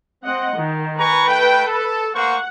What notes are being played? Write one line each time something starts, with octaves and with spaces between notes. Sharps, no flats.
C4 D#5 F#5
D#3
B4 G#5 A#5 C#6
A3 G5
A4
A#3 C5 F#5 C#6